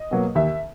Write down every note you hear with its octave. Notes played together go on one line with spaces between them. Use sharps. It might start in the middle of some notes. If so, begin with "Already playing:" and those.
Already playing: D#5
B2 F#3 A#3
D#2 E5